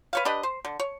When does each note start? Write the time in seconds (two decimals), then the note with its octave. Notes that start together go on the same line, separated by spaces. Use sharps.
0.13 B4 C#5 F5
0.25 D4 G4 B4 D#5
0.43 C5
0.65 D3
0.80 C#5